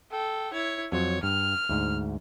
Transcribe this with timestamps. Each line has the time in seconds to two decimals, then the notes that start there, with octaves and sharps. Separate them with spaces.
0.11 A4 G5
0.53 E4 C#5
0.92 F2 F#3 C5 C#5
1.23 G2 F6
1.69 D2 G#2